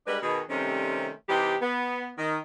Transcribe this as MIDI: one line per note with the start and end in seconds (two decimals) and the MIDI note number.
0.07 0.17 55
0.07 0.17 56
0.07 0.17 62
0.07 0.17 70
0.07 0.17 71
0.22 0.41 47
0.22 0.41 51
0.22 0.41 68
0.49 1.09 48
0.49 1.09 51
0.49 1.09 55
0.49 1.09 57
0.49 1.09 60
0.49 1.09 61
1.29 1.56 48
1.29 1.56 52
1.29 1.56 63
1.29 1.56 67
1.61 2.09 59
2.18 2.38 51